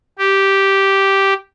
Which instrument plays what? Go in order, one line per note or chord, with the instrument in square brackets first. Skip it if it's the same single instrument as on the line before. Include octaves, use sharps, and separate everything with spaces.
[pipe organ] G4